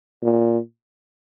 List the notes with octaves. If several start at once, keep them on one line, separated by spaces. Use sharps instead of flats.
A#2